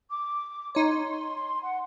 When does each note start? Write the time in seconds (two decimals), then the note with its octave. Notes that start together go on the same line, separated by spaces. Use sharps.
0.10 D6
0.75 D#4 C#5 C6
1.63 F#5